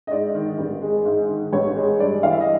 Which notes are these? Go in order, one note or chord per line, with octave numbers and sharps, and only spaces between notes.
D#5
G#2 D5
D#3
A1
G#3
G#2
D#3
A1 C#5
G#3
G2 D5
E3 F5
E5
D#5